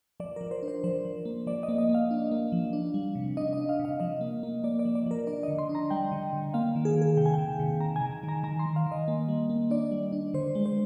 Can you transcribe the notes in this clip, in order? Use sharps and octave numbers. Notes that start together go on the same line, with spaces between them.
F3 D5
F3 A#4
C5
D4
C5
F3 C5
F3
A#3
F3 D5
D#5
A#3
D#5
A#3
F5
D4
A#3
F3
D4
G3
C3
D4 D#5
D4 D#5
F5
C3
F5
F3 D#5
A#3
A#3
A#3 D5
D5
F3
D5
F3 A#4
D4 D5
D3 D#5
C6
D4
A#5
G3 G5
D3
D3
A#3 F5
D#3
G#4
D#3
G#4
C3 G5
G#5
D#3 G5
C3
D#3 A#5
G#5
D#3
D#3
A#5
D#3 A#5
C6
D#3
F5
D#3
D#5
A#3
G3
A#3
D4 D5
G3
D4
D3 C5
G#3
C5